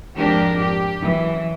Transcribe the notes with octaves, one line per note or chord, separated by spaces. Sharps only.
F2 G#2 D4 G4 A#4
G4
F#2 E3